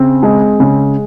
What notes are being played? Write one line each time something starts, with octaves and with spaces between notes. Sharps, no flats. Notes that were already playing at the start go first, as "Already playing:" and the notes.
Already playing: C#3 C4
G#3
C#3